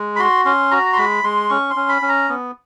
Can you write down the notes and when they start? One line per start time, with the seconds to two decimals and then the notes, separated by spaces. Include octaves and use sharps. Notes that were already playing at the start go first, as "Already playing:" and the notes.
Already playing: G#3
0.16 B5
0.19 F#4 C6
0.45 C#4 C6
0.71 F#4 A#5
0.93 C6
0.97 G#3 B5
1.24 G#3 C6
1.50 C#4 C#6
1.70 C6
1.76 C#4
1.89 B5
2.02 C#4
2.09 A#5
2.29 B3